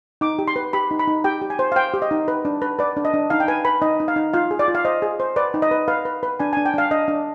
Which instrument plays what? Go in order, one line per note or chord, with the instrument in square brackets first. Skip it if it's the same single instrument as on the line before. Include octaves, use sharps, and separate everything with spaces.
[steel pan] D#4 D6
G4
C6
B4
G4 B5
D#4
B5
D#4
G4 G5
G4
G#5
C5
F5
C5 G5
G4
D#5
D#4
B4
D4
B4
B4 D5
D4
D#5
D4
D#4 F5
G5
B4 G#5
B4 B5
D#4 D#5
D#4
F5
D#4
F4 F5
G#4
D5
F4
F5
C5 D#5
G#4
C5
B4 D5
D#4
D#5
B4
B4 F5
B4
B4
D4 G#5
G#5
D4
G5
D4 F5
D4 D#5
D4